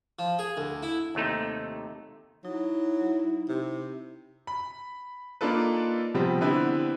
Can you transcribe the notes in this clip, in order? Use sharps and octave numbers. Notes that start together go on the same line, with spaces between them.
F3
G#4
D2
E4
D#2 C3 A3 D#4
F#3 D#4 E4
C3
B5
A#3 D4 D#4 F4 A4 B4
C3 F3 G3 B3 C4
D3 B3 C4 E4 G4 B4